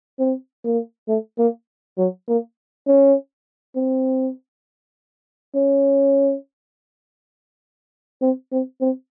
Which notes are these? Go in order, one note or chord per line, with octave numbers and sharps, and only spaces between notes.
C4
A#3
A3
A#3
F#3
A#3
C#4
C4
C#4
C4
C4
C4